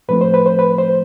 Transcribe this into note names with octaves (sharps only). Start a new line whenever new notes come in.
A2 F3 A3 C4 B4
C5
B4
C5
B4
C5